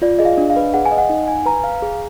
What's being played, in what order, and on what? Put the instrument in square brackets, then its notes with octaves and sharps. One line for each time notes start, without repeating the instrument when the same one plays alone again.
[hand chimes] F4 [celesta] D5
[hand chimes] G#4 [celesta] D#5
[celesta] F5
[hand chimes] D4
[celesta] F5
[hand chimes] B4
[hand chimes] G#4 [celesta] F#5
[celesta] G#5
[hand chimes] D#5
[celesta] F#5
[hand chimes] D#4
G#5
[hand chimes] B4 [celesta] A#5
[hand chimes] F5
G#4